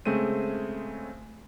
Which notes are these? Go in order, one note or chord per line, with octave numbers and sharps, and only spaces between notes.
C#3 G#3 A3 C4 C5 D#7